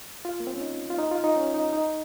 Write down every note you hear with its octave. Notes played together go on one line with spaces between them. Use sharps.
F4
A#3
C4
C#4
D#4
F4
D#4
F4
D#4
C#4
D#4
D#4